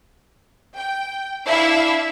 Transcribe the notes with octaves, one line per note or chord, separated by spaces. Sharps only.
G5
D4 E4 E5 F5